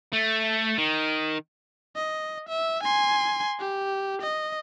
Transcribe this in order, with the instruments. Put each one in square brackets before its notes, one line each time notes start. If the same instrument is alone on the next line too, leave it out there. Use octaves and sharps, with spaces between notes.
[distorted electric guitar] A3
D#3
[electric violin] D#5
E5
G#5 C6
G4
D#5